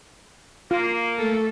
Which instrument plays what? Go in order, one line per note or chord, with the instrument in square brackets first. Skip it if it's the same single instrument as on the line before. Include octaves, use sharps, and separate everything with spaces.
[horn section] A#3 [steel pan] F4
[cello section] A3 A4